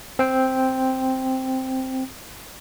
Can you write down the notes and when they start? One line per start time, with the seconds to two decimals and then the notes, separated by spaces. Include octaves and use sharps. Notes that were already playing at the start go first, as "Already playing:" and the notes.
0.19 C4 G5